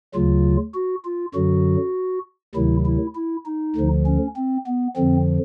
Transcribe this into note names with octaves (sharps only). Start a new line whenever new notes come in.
D2 C#3 F#3 F4
F#4
F4
F#2 D3 F#3 F#4
D2 C3 D#3 F#3 E4
E4
E4
D#4
D2 D3 F3
C#4
C4
B3
F2 D3 F3 C4